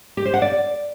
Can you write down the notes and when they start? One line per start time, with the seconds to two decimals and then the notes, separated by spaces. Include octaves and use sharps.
0.17 G4
0.25 C5
0.34 F#5
0.42 D5